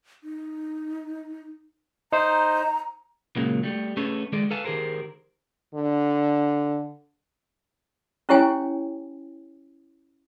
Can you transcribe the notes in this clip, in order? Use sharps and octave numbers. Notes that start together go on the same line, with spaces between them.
D#4
D#4 C5 A#5
A#2 C#3 F#3 G#3 A#3
G3 A3
A3 C#4 G#4 A4 B4 C#5
D#3 G#3 A4 D5
A4 B4 F5 G#5 A5
D#3 G4 G#4 A#4 C5
D3
C#4 E4 G4 C#5 G5 G#5